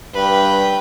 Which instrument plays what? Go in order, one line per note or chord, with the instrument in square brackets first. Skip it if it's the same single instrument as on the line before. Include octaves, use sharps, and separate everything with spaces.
[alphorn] G2 [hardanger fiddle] B4 G5